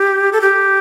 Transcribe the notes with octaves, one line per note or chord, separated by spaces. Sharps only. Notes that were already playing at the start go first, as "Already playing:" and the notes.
Already playing: G4
A4
G4